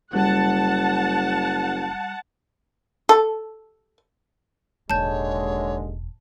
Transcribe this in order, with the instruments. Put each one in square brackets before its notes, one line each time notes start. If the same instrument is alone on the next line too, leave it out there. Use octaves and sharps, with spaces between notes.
[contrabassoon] F#1 [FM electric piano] G3 F#6 [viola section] F#5 A5
[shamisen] A4
[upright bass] E1 A1 [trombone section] D#2 D3 G#3 [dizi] C#5 [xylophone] A5 G6